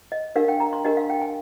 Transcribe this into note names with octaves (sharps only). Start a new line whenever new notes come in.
D#5
D4 G4 A#4 F5
G5
A#5
C6
D4 G4 A#4 D#5
F5
G5
G#5